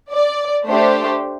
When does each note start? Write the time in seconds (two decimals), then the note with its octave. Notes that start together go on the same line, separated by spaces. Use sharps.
0.11 D5
0.66 A3 D4 G4 C5